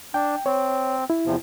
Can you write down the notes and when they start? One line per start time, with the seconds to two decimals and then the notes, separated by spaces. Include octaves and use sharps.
0.14 D4 G5
0.46 C4 C#5
1.10 E4
1.26 E2 C3 F3